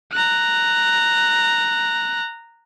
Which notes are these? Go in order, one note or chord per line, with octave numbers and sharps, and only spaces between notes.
A#5 F#6